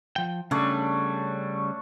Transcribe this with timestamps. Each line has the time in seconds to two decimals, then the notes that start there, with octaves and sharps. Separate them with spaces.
0.16 F3 G5
0.51 C#3 G3 A3 D4 C#5